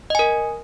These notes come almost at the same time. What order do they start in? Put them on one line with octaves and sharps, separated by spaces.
D#5 G#5 A#4